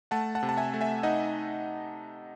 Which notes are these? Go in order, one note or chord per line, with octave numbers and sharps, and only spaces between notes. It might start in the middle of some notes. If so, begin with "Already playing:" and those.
A3 F#5 A5
F#5 A5
C3
A5
E5 G#5
A3
E5 G#5
D#4 D#5 F#5